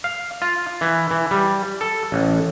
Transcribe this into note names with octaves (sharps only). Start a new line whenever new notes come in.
F5
F4
E3
E3
G3
A4
A1